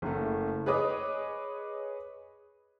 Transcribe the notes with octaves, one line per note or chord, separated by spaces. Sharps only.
F#1 C#3 A3
G#4 B4 C#5 D#5 D6 D#6